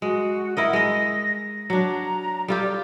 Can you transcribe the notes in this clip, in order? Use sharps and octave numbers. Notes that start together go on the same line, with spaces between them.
G#3 F#4
E4 A#4 D#5 F#5
G#3 D#5 A#6
F#3 D4 A#5
G3 F4 G4 A4
D5